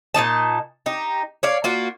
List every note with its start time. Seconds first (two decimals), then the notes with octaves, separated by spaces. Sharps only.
0.14 A#2 G#3 D#4 A5
0.86 D#4 G4
1.43 C#5 D5 F5
1.64 A#3 F4 F#4